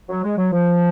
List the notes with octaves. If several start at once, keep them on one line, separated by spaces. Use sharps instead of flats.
F#3
G#3
F#3
F3